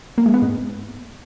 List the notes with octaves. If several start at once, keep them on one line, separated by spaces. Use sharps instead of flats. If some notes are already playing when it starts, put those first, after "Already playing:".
A#3
G#3
B3
G#2